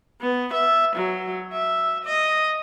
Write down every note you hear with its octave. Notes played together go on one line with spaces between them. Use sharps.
B3
E5
F#3
E5
D#5